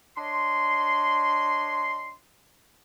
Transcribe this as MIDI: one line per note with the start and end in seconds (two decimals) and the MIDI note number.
0.17 2.15 62
0.17 2.15 73
0.17 2.15 75
0.17 2.15 84